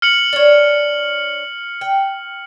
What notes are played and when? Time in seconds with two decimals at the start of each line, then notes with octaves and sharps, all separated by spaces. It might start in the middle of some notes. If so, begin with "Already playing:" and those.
0.02 F6 C#7 F#7
0.33 D4 C#5
1.81 G5